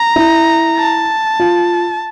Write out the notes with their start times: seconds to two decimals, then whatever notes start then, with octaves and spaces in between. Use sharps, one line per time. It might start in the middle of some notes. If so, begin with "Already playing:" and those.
Already playing: A#5
0.16 E4
0.77 A5
1.39 F4